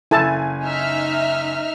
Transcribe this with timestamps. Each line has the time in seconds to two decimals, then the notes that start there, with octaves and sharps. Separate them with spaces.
0.11 F#1 E4 A4 G#5 A5
0.65 D#4 E5 F6